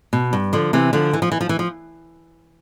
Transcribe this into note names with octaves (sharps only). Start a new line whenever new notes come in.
B2
G2
D3 F3
C3 E3
D3 F3
E3
F3
E3
F3
E3
F3